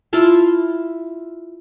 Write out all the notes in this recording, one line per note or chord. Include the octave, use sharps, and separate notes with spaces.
E4 F4 A5 C6